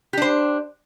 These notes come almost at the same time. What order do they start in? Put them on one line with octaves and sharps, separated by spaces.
G4 D4 C5